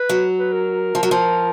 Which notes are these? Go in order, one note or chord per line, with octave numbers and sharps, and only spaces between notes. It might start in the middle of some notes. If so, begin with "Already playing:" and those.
Already playing: B4
F#3
B4
A#4
F3
F#3
F3